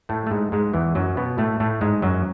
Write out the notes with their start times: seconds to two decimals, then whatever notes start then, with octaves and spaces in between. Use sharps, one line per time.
0.09 A2 A3
0.27 A3
0.31 G#2 G#3
0.52 G#2 G#3
0.73 E2 E3
0.95 F#2 F#3
1.17 B2 B3
1.38 A2 A3
1.60 A2 A3
1.81 G#2 G#3
2.02 F#2 F#3